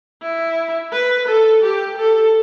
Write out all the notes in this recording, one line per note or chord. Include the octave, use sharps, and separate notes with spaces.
E4
B4
A4
G4
A4